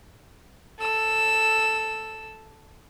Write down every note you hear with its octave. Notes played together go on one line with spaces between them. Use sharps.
A4 E6